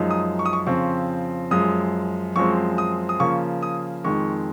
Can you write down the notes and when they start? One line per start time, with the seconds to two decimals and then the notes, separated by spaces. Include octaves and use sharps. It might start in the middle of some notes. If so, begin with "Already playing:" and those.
Already playing: F#2 F3 G#3 D#4
0.10 D#6
0.39 C#6
0.46 D#6
0.53 C#6
0.66 F2 C#3 F3 C4 C#6
1.51 F#2 F3 G#3 D#6
2.36 F#2 F3 G#3 C4 C#6
2.78 D#6
3.09 D#6
3.20 C#3 F3 A#3 C#6
3.63 D#6
4.04 F2 D#3 G#3 C#6